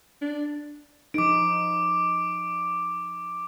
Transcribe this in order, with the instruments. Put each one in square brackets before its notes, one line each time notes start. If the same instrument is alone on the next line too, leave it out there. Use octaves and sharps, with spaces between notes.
[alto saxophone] D4
[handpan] F3 D#4 [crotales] D6 D7